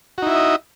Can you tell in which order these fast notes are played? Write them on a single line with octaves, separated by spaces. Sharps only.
F#4 D#4 E4 E5 D#5